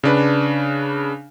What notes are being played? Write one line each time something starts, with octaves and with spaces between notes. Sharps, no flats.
C#3 D4 B4